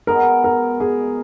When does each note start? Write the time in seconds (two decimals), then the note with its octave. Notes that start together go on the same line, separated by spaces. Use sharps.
0.07 B2 G#3 B3 A#4
0.44 A#4
0.80 G#4